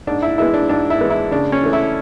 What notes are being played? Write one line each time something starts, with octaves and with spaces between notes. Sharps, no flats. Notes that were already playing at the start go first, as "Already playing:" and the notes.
G#2 D4
E4
E3 G#3 B3 E4
D4
G#2 D4
E4
E3 G#3 B3
E4
C#3 D4
C#4
E3 A3
E4